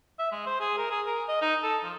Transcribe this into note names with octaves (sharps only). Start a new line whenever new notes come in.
E5
G#3
C5
G#4
A#4
G#4
A#4
D#5
D#4
A4
F3